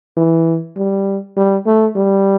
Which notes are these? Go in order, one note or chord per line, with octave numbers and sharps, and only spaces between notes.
E3
G3
G3
A3
G3